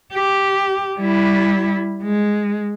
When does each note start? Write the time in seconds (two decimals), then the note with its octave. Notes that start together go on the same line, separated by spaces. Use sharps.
0.13 G4
0.99 G3 E4
2.03 G#3